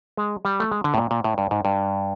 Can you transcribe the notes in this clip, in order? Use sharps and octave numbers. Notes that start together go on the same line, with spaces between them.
G#3
G3
A3
G#3
D3
A2
A#2
A#2
A2
G2
G#2
G2